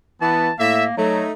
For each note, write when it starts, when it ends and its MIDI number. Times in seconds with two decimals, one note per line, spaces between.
0.21 0.50 52
0.21 0.50 59
0.21 0.52 81
0.59 0.86 45
0.59 0.94 58
0.59 0.86 76
0.98 1.23 54
0.98 1.32 57
0.98 1.32 63